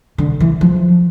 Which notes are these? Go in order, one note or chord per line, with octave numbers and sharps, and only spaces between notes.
D3
E3
F3